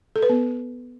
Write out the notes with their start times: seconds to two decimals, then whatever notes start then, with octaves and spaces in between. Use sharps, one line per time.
0.16 A4
0.23 B4
0.29 B3